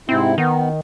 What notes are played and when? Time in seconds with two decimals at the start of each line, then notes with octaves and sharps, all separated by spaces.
0.09 G#2 C3 C4 E4
0.38 D#3 B3